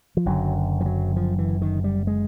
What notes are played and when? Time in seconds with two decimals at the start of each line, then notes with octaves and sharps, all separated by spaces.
0.17 F3
0.26 F#1 F#2 D3 F#3
0.81 F3
0.86 F#3
1.16 F3
1.38 E3
1.62 D#3
1.84 G3
2.07 G#3